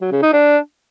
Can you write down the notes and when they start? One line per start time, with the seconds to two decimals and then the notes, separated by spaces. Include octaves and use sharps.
0.01 F#3
0.12 C#3
0.22 D#4
0.33 D4